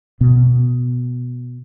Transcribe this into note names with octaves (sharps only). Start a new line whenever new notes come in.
B2 B3